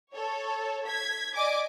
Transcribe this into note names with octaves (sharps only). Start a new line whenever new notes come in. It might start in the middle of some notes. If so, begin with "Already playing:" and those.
A4 C#5
G#6 B6
D5 D#5 G#5 D6